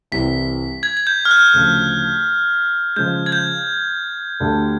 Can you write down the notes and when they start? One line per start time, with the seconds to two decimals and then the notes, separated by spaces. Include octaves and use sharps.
0.12 C2 C3 E3 B6
0.83 G#6
0.97 G#6
1.07 G6
1.25 F6
1.31 F#6
1.54 D2 C#3 F3
2.96 C#3 F3 G#3 G6
3.26 G#6
3.32 G6
4.40 D2 D3 G3